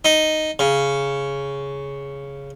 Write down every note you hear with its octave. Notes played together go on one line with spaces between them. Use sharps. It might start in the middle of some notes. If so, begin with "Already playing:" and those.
D#4
C#3